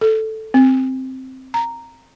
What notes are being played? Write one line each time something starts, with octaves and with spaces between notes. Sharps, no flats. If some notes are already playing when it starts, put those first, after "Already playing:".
A4
C4
A#5